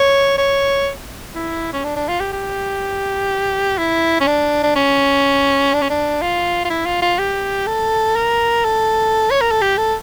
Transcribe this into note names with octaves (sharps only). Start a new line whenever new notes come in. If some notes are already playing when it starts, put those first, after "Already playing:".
Already playing: C#5
C#5
E4
C#4
D4
D4
F4
G4
G4
E4
C#4
D4
D4
C#4
D4
C#4
D4
F4
F4
E4
F4
F4
G4
A4
A#4
A4
C#5
A#4
A4
G4
A4